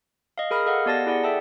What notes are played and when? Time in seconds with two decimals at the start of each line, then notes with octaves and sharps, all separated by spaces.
0.38 D#5 F5
0.51 G#4 A#4 B5 D#6 F6
0.66 A4 D#5 F5 F#5
0.86 B3 G4 D5 A5 A6 A#6
1.06 E4 G#4 D5 F#5
1.24 A4 E5 G5 A5